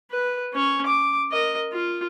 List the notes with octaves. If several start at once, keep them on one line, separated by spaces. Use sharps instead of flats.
B4
C#4 C#5
D6
A#4 D#5
F4